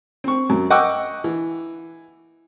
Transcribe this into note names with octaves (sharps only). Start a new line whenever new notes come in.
C4 C#6
F#2
D#5 F#5 G5 C#6 D6 E6
E3